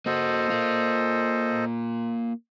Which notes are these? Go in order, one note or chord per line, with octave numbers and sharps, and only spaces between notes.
A#3 F#4 A4 C5 D#5
A#3 F4